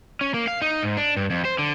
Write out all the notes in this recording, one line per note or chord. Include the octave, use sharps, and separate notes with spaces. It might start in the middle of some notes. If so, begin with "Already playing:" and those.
C#4
A#3
F5
D#4
G#2
D4
G2
F2
C5
D3